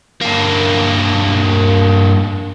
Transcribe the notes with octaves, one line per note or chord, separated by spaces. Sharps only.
G2 A#3